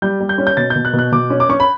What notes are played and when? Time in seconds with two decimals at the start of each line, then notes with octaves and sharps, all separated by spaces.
0.02 G3 G6
0.20 G3
0.29 G6
0.38 C#4
0.47 G6
0.57 B2 A6
0.70 G6
0.76 B2
0.85 F#6
0.93 B2
0.99 F#6
1.12 B2 D6
1.30 C#4
1.40 D6
1.49 C#4 C#6
1.60 B5